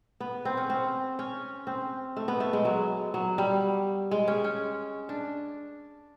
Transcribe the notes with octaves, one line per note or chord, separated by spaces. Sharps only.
B3
C4
C#4
C4
C#4
C4
A3
B3
A3
G#3
F#3
F#3
G3
G#3
C#4
C#4
D4